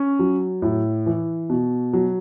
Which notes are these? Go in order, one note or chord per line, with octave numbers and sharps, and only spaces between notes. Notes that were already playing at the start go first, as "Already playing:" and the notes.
Already playing: C#4
F#3
A2
E3
B2
F#3